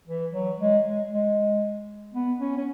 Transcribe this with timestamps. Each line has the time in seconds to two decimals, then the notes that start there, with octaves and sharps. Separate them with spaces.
0.07 E3
0.33 F#3
0.59 G#3
0.84 G#3
1.10 G#3
2.14 B3
2.39 C#4
2.57 C#4